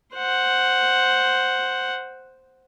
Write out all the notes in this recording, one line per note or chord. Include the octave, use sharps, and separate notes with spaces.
C5 F#5